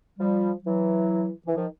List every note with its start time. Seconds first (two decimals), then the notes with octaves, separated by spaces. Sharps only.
0.19 F3 G3
0.65 E3 F#3
1.47 E3
1.56 D#3 F3